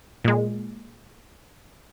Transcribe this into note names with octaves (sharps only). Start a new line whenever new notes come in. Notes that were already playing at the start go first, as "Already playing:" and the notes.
A#2 G#3